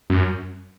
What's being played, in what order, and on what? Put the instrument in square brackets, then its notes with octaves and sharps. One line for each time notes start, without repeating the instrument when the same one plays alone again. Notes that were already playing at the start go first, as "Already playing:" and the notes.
[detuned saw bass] F#2